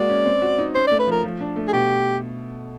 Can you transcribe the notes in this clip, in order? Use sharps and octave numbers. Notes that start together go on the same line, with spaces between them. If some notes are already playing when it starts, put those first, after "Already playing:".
Already playing: G#3 A#3 F#4 D5
C#4
C4
F#4
D#4
C#4 C5
A3 D5
B4
F3 A#4
F3
D4
A3
G#4
B2 G4